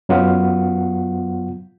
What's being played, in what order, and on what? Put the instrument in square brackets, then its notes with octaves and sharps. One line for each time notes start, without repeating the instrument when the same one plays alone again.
[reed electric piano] F#2 F#3 B3 F4 F#5